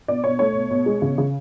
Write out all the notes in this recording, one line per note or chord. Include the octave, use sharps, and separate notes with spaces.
B2 D5
B2 C#5
A3 C#5
B2
B2
G#3
C#3
C#3